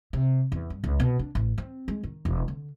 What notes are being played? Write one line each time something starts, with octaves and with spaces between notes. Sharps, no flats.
C3
E2
G2
C#2
B2
D4
A1
C4
G#3
D#3
E1
D3